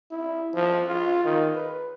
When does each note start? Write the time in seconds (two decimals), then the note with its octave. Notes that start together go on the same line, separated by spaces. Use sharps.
0.11 E4
0.54 F3
0.87 F4
1.25 D#3
1.55 B4